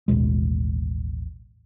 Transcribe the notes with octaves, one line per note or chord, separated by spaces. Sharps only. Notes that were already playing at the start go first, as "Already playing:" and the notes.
A1 D#2 B2 G#3